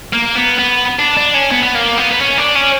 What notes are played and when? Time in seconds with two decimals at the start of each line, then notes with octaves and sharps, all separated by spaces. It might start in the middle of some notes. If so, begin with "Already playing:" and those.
0.13 A#3
0.35 B3
0.59 B3
0.99 D4
1.17 D4
1.34 C#4
1.51 B3
1.63 B3
1.75 A#3
1.98 B3
2.11 B3
2.21 C#4
2.37 D4
2.55 C#4